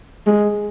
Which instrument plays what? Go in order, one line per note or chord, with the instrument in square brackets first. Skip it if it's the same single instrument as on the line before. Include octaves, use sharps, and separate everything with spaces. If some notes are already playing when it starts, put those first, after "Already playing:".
[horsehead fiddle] G#3